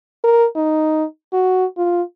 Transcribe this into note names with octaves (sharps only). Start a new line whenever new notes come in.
A#4
D#4
F#4
F4